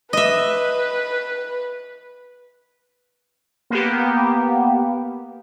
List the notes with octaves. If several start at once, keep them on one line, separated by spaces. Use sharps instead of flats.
B4 D#5 E5
A#3 B3 G4